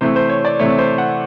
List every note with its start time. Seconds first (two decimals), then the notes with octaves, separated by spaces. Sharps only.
0.01 C3 E3 A3 C5
0.16 C5
0.29 C#5
0.45 D5
0.59 C3 E3 A3 C#5
0.78 C5
0.98 F#5